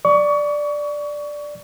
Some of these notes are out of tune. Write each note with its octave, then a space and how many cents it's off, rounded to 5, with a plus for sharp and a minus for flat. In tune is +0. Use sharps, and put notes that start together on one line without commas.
D5 +0 C#6 +25